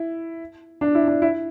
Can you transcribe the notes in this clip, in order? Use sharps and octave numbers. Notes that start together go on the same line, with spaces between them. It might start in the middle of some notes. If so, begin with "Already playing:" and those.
Already playing: E4
D4
E4
D4
E4